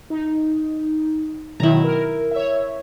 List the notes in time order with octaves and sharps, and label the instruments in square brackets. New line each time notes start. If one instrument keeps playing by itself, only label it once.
[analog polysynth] D#4
[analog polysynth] B2 D#3 F#3 [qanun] E4 A#5
[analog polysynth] A#4
C#5 E5